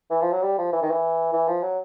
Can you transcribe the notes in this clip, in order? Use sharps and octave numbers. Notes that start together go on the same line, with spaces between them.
E3
F3
F#3
G3
F3
E3
D#3
E3
E3
F3
F#3